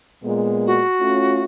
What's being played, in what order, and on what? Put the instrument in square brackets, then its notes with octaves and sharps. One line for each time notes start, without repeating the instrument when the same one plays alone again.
[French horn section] A#2 G#3 B3
[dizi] F#4
[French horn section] A3 C#4 F4